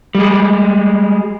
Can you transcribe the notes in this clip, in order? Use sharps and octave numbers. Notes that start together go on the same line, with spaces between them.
G3 G#3